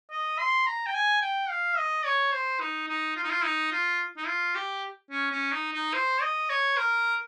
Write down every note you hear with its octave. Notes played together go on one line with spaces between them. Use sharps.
D#5
C6
A#5
G5
G#5
G5
F5
D#5
C#5
C5
D#4
D#4
F4
D#4
F4
D#4
F4
D#4
F4
G4
C#4
C#4
D#4
D#4
C5
D#5
C#5
A#4